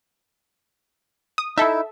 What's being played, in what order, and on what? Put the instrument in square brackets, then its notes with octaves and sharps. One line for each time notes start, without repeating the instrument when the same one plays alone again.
[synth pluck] D#6
[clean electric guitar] D#4 E4 [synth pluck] A4 E5